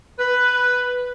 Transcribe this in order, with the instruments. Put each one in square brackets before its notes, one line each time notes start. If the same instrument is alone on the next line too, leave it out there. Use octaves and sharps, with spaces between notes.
[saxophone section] B4